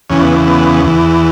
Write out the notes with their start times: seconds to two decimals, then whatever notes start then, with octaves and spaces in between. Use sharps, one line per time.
0.10 E2 C#3 E3 C#4
0.22 B3
0.47 B3
0.85 E2 E3